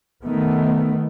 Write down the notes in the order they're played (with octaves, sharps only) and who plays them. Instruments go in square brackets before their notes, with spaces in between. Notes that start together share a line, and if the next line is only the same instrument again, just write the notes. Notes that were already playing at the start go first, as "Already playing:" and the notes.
[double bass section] D#3 A3 B3